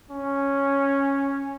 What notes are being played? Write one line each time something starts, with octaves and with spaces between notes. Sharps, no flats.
C#4